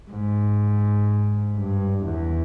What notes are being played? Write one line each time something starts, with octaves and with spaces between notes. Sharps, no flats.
G#2
G2
E2